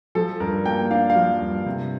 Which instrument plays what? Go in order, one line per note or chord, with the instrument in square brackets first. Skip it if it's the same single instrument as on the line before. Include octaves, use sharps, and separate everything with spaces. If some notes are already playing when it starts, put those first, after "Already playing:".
[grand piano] F3 A4
G2 A#4
A#3 G5
D4 F5
F5
F3
G2
C3